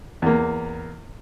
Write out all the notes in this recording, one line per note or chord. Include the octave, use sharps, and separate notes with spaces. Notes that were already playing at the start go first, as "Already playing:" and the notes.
E2 A#3